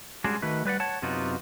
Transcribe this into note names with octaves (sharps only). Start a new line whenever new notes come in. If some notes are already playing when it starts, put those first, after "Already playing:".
G3 G#3 C#4 D4 F#4 G#4
D#3 A3 F#4 B4
G3 B4 D5 F#5
C#5 F#5 A5
F#2 C3 B3 D#4 F4 F#4